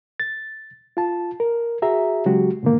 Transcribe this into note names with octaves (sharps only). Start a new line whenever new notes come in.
A6
F4 A5
A#4
F#4 G#4 E5 A#5
C#3 F#3 G#3 F#4 G4
G#2 B2 D3 D#3 A#3